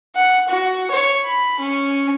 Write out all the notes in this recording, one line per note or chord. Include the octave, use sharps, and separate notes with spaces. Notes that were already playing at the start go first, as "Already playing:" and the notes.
F#5
F#4
C#5
B5
C#4